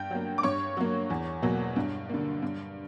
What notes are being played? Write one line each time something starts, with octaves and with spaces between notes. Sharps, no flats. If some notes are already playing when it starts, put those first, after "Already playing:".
Already playing: G2 G5 G6
F#3 A#3
D6
G2 C#5 C#6
F#3 A#3
E2
B2 F#3 A#3
G2
D3 A#3
G2